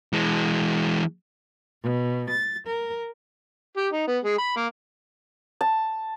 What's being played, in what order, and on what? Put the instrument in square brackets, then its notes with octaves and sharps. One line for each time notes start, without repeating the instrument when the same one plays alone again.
[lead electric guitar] E3 G#3
[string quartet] B2
A6
A#4
[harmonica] G4
D#4
B3
G#3
B5
A#3
[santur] A5